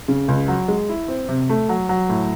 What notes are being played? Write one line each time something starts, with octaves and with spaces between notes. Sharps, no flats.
C#3
C#2
F#3
G#3
E4
C4
C3
A3
F#3
F#3
A2